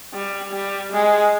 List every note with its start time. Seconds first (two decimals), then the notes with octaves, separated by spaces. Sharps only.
0.14 G3
0.53 G3
0.92 G#3